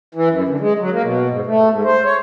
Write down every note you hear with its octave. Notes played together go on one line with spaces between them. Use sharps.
E3
F#2
D3
G#3
F#3
A#3
B2
G#2
A3
G#2
C5
C#5